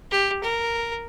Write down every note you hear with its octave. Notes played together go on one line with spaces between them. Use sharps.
G4
A#4